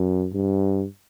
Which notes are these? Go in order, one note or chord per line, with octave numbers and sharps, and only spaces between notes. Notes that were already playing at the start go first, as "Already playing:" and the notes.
Already playing: F#2
G2